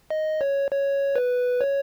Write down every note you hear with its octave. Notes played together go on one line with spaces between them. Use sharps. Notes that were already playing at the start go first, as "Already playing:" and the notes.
D#5
C#5
C#5
B4
C#5